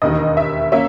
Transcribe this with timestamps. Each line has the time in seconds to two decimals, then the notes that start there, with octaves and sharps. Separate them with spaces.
0.02 E1 D#2 D#3 D#5
0.37 E5
0.72 A#3 C#4 E5